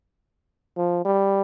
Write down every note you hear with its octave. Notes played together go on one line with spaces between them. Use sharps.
F3
G3